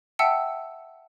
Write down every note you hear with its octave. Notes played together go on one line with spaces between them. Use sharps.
E5 F#5 G5 A5 E6 C#7